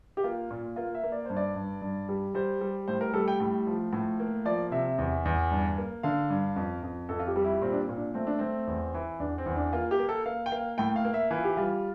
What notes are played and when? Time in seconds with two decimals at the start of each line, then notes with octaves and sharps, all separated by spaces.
0.17 G4
0.24 A#3 F4
0.51 A#2
0.76 A#3 F4
0.95 E5
1.03 A#3
1.12 D5
1.25 G2 C5
1.37 D5
1.56 G2
1.82 G2
2.09 G3
2.34 G3 C5
2.61 G3
2.88 A2 C5
3.01 A#4
3.14 G3 A4
3.28 G5
3.40 A2
3.67 F3
3.93 A2
4.20 A#3
4.45 F3 D5
4.72 C3 E5
4.98 E2
5.25 E2
5.51 G2
5.78 A#3
6.03 D3 F5
6.30 G2
6.56 F2
6.83 F2
7.09 F2 A4
7.19 F4
7.27 G4
7.36 G3
7.44 E4
7.61 A#2 C4
7.73 D4
7.80 C4
7.89 A#2
7.97 D4
8.14 A3 C4
8.27 D4
8.39 A3 C4
8.67 E2
8.94 E3
9.20 E2 D4
9.38 C4
9.46 E2
9.56 D4
9.73 A#3 F4
9.91 G4
9.99 A#3
10.09 A4
10.26 A#3 F5
10.46 G5
10.52 A#3 F5
10.78 A2 G5
10.96 F5
11.05 A#3
11.14 E5
11.31 E3 F4
11.44 G4
11.57 G3 F4